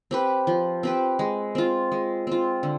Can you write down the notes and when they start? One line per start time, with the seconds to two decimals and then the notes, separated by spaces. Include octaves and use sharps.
0.11 C4 G4 B4
0.47 F3
0.83 C4 G4 B4
1.19 G#3
1.55 C4 F4
1.92 G#3
2.27 C4 F4
2.63 D3